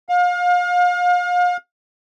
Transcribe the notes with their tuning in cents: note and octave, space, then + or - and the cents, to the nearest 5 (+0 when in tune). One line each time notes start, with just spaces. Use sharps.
F5 +35